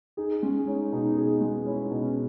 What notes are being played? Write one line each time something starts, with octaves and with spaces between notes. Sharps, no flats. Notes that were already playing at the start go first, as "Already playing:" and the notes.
D#4 G#4
G#3 C#4
C#4 D#4
B2 D#4
G#4
G#3
C#4 E4
D#4
B2
C#4